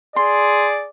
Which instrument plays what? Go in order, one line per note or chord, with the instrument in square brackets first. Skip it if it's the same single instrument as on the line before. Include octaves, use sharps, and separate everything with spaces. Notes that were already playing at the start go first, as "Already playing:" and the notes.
[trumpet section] G#4 D5 [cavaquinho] C6